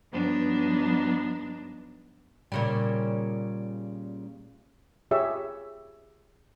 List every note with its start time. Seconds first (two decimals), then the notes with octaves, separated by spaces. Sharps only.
0.12 G2 F3 F#3 B3 D4 D#4
2.52 A#2 C#3 G3
5.11 F4 G4 G#4 C#5 E5